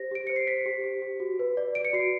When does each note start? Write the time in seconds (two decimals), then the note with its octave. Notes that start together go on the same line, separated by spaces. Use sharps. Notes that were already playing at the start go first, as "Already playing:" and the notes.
Already playing: G4 C5 A#6
0.11 G4 D7
0.27 C5 C#7
0.36 C7
0.47 C5 B6
0.66 G4
0.84 G4
1.02 G4
1.20 F#4
1.39 B4
1.57 D5
1.75 D5 D7
1.85 C#7
1.93 F#4 C7